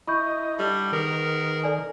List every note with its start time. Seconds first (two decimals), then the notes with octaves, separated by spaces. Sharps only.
0.07 E4 D#5 B5 C#6 G6
0.58 D3 G3
0.92 D#3 B3 G#4 A#4
1.64 A4 D5 G#5